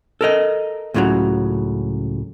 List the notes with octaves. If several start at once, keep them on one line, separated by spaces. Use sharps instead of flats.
A4 A#4 D#5
C#2 A2 C#3 E3 F#3